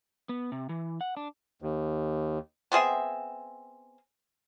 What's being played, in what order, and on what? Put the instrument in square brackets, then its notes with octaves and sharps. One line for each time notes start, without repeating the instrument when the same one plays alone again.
[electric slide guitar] B3
C3
E3
F#5
D4
[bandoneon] D#2
[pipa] B3 C4 G#4 E5